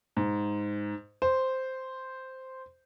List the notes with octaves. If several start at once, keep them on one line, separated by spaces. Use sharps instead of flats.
G#2
C5